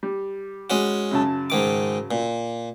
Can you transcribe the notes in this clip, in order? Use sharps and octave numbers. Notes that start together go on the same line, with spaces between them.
G3
G#3 C#4 F#4
F#2 C#3 A5
G#2 D#3 D6
A#2